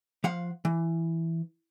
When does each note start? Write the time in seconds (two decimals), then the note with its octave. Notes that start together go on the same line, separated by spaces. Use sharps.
0.24 F3 F5 F#5
0.65 E3